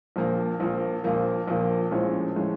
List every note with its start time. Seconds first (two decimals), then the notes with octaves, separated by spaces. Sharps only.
0.16 A#1 A#2 F3 A#3
0.60 A#1 A#2 F3 A#3
1.04 A#1 A#2 F3 A#3
1.47 A#1 A#2 F3 A#3
1.91 A#1 A2 F3 G#3 C#4
2.36 A2 F3 G#3 C#4